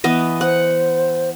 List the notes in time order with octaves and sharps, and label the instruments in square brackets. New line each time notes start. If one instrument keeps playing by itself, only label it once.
[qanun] E3 B3 D#5
[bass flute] C5 [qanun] F#5